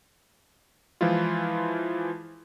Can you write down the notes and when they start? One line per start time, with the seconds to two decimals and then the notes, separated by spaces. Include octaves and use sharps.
1.01 E3 F3 G#3 E4 F4